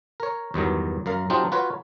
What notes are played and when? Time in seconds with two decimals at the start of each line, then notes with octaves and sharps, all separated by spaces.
0.20 A#4 C#5
0.54 E2 G2 D#3 F#3
1.06 F#2 A#4 F5
1.30 F#3 C4 D4 D#4 F4 G4
1.52 F4 F#4 B4 C#5